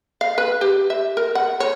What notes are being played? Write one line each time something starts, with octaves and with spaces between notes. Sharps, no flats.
F5
B4
G4
E5
A#4
F#5
C#5